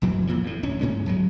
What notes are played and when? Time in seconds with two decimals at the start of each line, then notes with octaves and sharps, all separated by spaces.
0.02 E1 F2 E3 F#3
0.27 D#1 A#2 E3 F3
0.44 E2 A2
0.63 D1 C#4
0.81 G2 G#3 C#4
1.06 D1 F#3 G#3